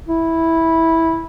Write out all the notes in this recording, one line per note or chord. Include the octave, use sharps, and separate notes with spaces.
E4